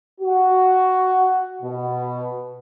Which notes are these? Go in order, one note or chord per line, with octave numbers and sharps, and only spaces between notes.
F#4
B2